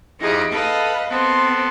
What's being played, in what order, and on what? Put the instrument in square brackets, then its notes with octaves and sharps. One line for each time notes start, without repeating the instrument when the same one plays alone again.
[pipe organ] F2 [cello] D#4 G4 [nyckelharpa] E4 G#4
[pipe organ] A4 [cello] B4 [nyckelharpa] D#5 F5
[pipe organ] B3 A4 [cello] C4 [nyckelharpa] C6